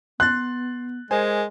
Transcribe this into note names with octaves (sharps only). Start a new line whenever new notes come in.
B3 C6 F#6 A6
G#3 A#4 C5 G#5